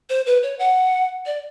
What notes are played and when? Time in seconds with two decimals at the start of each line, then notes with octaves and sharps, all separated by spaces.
0.10 C5
0.26 B4
0.43 C#5
0.59 F#5
1.26 D5